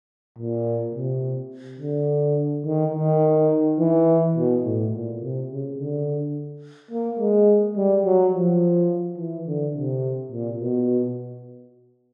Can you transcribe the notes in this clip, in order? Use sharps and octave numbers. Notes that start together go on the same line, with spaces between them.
A#2
C3
D3
D#3
D#3
E3
B2
A2
A#2
C3
C#3
D3
A#3
G#3
G3
F#3
F3
E3
D3
C3
A#2
B2